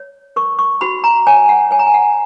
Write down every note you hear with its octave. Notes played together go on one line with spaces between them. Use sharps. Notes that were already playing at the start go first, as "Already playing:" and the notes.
Already playing: C#5
A#4 C#6
C#6
F#4 B5
A#5
C#5 G#5
F#5
C#5 G#5
A#5
G#5
F#5